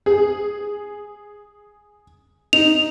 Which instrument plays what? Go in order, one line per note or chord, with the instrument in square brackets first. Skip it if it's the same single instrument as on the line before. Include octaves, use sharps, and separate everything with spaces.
[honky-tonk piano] G#4
[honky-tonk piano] D#4 [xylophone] F7